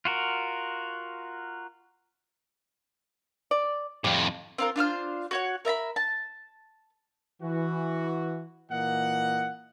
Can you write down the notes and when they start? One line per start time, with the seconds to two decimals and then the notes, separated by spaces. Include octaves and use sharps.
0.05 F4 F#4 A#4
3.51 D5
4.04 F2 A2 G4
4.58 C4 F4 A#4
4.76 D4 F4 C5 F6
5.31 F#4 C#5 F#5
5.65 A#4 E5 A#5 B5
5.96 A5
7.42 E3 F#4
8.70 A#2 E3 A#3 D#5 F#5